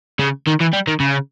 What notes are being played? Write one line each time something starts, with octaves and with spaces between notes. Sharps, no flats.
C#3
D#3
E3
G3
D#3
C#3